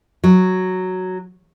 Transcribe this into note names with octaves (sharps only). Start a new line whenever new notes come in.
F#3